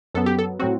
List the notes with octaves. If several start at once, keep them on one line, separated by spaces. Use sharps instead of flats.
F#2 F#3 B3 A4
G4
A4
A2 F#3 C4 F#4